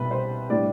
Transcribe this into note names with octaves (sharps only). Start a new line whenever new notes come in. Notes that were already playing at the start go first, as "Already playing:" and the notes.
Already playing: C2 B2 G3 B4
C5
A2 G3 D4 D5